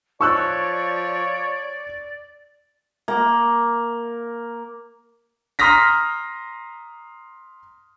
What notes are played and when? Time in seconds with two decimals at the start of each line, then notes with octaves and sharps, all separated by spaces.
0.21 F3 C#5 D5 C#6 E6 F#6
3.08 A#3
5.59 A#5 C6 D#6 F6 A#6 B6